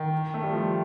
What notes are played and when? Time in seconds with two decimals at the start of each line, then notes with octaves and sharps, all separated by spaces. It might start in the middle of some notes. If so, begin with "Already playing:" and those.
Already playing: D#3
0.34 A3
0.43 G3
0.52 F3